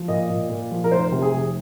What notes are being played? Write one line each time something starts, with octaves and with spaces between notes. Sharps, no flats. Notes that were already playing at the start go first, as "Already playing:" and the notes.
Already playing: F3
A#2 D#5
A#2
A#2
F3
A#4
F1 C5
C3
G#4
F1